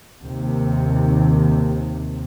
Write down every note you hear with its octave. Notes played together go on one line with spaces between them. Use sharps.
D#2 C3